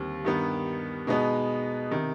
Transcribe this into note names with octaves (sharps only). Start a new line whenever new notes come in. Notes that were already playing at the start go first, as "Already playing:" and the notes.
Already playing: D#2 D3 G3 C4
G2 D#3 B3
B2 G#3 B3 D#4
C3 D#3